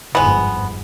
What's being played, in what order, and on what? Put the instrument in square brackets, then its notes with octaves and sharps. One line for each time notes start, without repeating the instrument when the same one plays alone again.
[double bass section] G1 F2 G#2 [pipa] G#3 B3